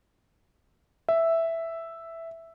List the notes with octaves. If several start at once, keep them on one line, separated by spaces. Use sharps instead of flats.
E5